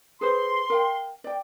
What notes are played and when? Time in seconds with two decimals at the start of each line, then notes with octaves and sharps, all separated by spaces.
0.21 G#4 B4 C5 C6
0.70 A#4 F5 G5
1.24 D5 G5